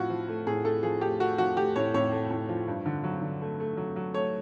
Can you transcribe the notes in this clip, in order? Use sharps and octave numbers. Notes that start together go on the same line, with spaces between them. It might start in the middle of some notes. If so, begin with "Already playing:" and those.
Already playing: A2 F3 F4 F#4
F3
A3
A2 G#4
A3 A4
F3 G#4
A3 G4
A3 F#4
F3 F#4
A3 G4
A2 C#5
A2 C#5
A3
A2
F3
G2
D3
F#3
D3
A3
A3
F#3
F#3
A3 C#5